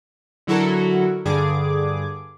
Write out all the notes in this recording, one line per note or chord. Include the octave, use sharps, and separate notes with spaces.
D3 F#3 E4 F#4 A4 A#4
G2 D3 G#4 D6